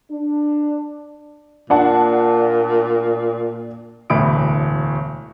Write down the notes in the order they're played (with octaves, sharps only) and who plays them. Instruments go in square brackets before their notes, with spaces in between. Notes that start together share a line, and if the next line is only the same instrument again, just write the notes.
[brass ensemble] D4
[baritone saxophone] A#2 [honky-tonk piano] D4 F#5 A5
[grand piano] E1 D2 A2 B5 D#6 D7